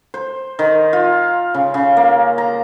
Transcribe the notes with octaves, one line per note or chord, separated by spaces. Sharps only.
C5
D#3
F4
C#3
C#3
A#3
A#5